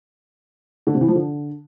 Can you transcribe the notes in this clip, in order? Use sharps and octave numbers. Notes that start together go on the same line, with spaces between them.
D3
C3
E3
F3
D3